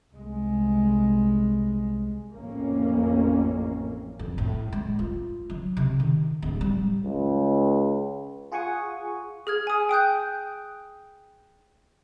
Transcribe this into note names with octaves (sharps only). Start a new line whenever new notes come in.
C2 G#3
A1 F2 A#3 C#4
F2
A2
G#3
F4
F#3
C3
D#3
D1
G3
C#2
F4 G#4 F#5 G#5 C#6 D#6
G#4 F6 G#6
G#5 D#6
G5 D#6 F#6 G6